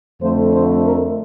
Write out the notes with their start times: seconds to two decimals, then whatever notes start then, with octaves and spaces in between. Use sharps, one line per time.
0.22 F2 D3 F3 A3 C5
0.53 C5
0.84 A#4